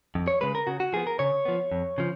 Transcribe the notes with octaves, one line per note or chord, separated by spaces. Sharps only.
F2
C#5
C#3 G#3 B4
A#4
C#3 F#4
F#4
F3 B3 G#4
A#4
C#3 C#5
F3 B3
F2
C#3 F3